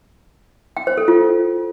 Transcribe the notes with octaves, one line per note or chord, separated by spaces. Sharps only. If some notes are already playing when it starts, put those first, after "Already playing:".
G5
C5
A4
F4